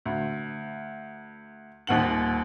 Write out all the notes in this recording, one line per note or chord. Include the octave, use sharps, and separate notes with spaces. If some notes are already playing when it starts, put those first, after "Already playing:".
D2
D#1 D#2 F#5 F#7